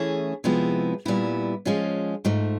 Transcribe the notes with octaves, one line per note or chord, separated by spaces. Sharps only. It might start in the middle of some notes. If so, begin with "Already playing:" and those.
Already playing: E3 A3 C#4 E4 G#4
C3 F3 G#3 B3 E4
A#2 G3 B3 E4
F3 G#3 C#4 F4
G#2 F3 A3